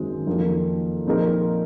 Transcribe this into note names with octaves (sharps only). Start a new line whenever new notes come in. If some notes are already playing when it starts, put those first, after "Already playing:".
Already playing: G#1 F#2 D#3 G#3 C4
F2 D#3 A#3
A#2 F3 C4 D#4 A#4